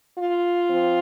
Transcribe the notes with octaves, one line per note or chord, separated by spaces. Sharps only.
F4
F3 C4